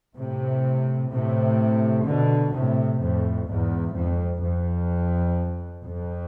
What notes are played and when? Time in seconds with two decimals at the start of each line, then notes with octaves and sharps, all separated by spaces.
0.16 A2 C3
1.11 A2 C3
2.06 B2 D3
2.53 A2 C3
3.00 F2 A2
3.47 E2 G#2
3.94 F2
4.42 F2
5.85 F2